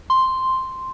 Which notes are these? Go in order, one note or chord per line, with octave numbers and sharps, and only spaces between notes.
C6